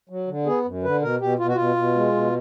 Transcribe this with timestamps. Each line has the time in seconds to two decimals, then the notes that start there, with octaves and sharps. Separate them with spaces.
0.09 F#3
0.28 D3
0.46 B3 G#4
0.66 F#2
0.83 D3 B4
1.01 B2 A#4
1.20 B2 G4
1.38 B2 F4
1.48 F#4
1.55 B2 F4
1.76 B2
1.95 G#3
2.13 B2